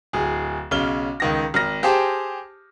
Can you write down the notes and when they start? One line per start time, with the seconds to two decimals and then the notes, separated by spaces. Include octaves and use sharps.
0.13 D1 G#4
0.71 B1 C#3 F6 G7
1.20 C#2 D#3 A#6
1.54 G#1 F6 A#6
1.83 G4 G#4 C5 G5 A5 C6